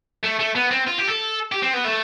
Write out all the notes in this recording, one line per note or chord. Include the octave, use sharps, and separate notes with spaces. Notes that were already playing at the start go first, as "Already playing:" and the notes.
A3
A3
B3
C4
F4
G4
A4
G4
C4
B3
A3